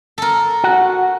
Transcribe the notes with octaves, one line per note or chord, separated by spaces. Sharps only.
A4 A#4
F#4 F#5